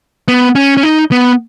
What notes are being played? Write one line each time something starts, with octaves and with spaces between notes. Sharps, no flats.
B3
C#4
C#4
D#4
B3